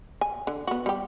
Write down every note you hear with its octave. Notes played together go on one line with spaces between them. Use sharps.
G#5
D3
B3 F#4
G3 G4